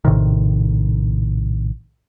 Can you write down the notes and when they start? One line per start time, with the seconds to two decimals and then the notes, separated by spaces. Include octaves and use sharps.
0.05 A#1 A2 C3 D#3